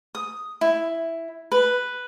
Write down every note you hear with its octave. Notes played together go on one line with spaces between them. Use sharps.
D#6
E4
B4